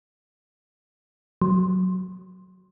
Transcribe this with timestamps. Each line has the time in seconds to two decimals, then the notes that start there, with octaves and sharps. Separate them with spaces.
1.42 F#3